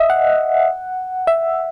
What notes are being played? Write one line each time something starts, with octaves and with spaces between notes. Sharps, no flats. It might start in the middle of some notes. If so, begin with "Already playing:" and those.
Already playing: D#5 E5
F#5
E5